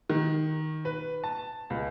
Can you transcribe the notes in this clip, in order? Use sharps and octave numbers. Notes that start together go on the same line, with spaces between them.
D#3
B4
A5
C#2